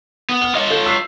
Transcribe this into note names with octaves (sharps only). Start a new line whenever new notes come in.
B3
F6 G7
F4 C#5 D#5
A4 G6
E6 B6 C7